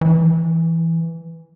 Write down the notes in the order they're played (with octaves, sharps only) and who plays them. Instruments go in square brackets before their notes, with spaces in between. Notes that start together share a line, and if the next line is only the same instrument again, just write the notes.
[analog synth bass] E3